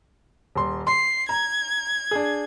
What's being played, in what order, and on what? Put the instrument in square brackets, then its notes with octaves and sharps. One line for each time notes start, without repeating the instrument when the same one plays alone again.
[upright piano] D#1 C6
[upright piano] C6 [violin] C7
[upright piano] A#5 [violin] G#6
[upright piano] D4 G#4